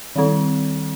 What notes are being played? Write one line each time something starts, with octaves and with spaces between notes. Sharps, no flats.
D#3 G3 C4